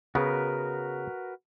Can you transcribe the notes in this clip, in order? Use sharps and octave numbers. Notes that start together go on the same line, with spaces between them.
C#3 B3 F#4 A#4 B4